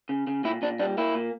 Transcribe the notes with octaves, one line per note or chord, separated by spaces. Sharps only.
C#3
C#3
A#2 E4
A#2 D4
G3 D4
A#3 E4
A#2